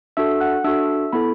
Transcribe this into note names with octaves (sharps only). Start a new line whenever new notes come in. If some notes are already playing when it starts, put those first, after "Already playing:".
D4 F#4 A4 E5 E6
F#5 F#6
D4 F#4 A4 E5 E6
B3 E4 A4 B5